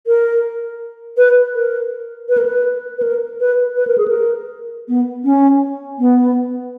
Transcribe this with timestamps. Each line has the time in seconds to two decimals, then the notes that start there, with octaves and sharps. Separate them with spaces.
0.07 A#4
1.17 B4
1.55 A#4
2.29 B4
2.38 A#4
2.45 B4
2.98 B4
3.03 A#4
3.40 B4
3.76 B4
3.87 A#4
3.98 G#4
4.08 A#4
4.88 B3
5.25 C#4
5.99 B3